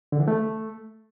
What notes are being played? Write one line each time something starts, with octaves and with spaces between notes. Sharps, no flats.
D3
E3
A3